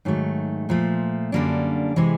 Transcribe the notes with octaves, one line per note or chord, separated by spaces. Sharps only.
G#2 D#3 F#3 A3
A#2 F3 A3
F#2 D3 G3 A#3 D4
C3 E3 G#3